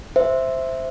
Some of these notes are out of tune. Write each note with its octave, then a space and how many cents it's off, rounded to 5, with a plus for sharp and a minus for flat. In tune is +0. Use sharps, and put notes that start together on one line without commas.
C5 +0 E5 +0